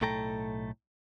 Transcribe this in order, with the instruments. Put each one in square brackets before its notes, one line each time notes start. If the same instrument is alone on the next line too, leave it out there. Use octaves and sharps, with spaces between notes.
[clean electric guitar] B1 A2 A3 A4 G5 A#5